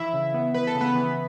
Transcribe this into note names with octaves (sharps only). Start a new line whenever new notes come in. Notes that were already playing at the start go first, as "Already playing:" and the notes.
Already playing: E3 E4 E5
C#3
B3
E3 B4
A4
C#3
B3 B4
E3